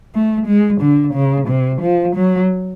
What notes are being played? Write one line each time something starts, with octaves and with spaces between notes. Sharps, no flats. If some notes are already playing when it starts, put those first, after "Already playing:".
A3
G#3
D3
C#3
C3
F3
F#3